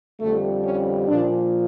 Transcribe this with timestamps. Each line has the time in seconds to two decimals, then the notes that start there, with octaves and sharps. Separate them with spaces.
0.20 F2 D3 G3 A3
0.63 C#4
1.08 A#2 F3 D4